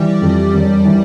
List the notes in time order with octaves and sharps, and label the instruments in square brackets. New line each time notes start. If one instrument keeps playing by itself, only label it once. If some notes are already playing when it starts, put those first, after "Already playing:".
Already playing: [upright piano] E3 [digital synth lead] G3
[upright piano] F2
E1
E3